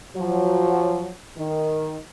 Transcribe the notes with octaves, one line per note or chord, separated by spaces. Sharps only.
F3 F#3
D#3